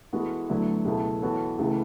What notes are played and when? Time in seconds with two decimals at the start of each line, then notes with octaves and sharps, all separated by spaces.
0.13 E3 G#3 B3 F#4 A4
0.49 D2 D3 F#3 B3 E4
0.85 C#2 B2 A3 E4 A4
1.22 E3 B3 F#4 A4 C#5
1.58 C#2 C#3 E3 A3